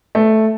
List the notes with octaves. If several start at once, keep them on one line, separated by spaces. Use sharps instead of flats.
A3